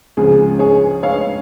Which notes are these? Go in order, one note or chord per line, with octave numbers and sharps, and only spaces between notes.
C#2 C#3 F3 G#4
G#4 C#5
C#5 F5